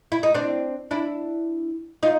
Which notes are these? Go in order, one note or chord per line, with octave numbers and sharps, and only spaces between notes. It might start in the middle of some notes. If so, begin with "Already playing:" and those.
E4
D#4
C4 D4
D4 E4
D#4 F4